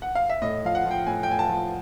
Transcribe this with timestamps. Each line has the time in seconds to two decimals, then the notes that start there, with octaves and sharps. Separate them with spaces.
0.02 F#5
0.15 F5
0.30 E5
0.42 A2 D#5
0.64 F3 F5
0.75 F#5
0.85 F3
0.91 G5
1.07 A2 G#5
1.23 G5
1.28 A2 G#5
1.39 A5
1.49 F3